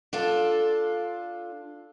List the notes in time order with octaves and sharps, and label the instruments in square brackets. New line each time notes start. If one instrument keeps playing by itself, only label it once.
[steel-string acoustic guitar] D4 F4 A4